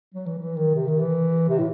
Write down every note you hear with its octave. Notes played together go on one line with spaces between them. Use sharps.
F#3
E3
E3
D#3
C3
D#3
E3
C3
A2